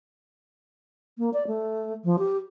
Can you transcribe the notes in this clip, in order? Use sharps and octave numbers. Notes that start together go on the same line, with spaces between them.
A#3
D5
A3
F3
G4